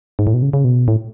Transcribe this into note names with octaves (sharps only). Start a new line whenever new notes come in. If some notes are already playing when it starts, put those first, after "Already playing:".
G#2
A2
B2
C#3
C#3
B2
A2